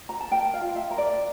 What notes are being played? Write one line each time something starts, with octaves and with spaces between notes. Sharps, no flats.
A#5
A5
A#4 G5
F5
F4
E5
A#4
D5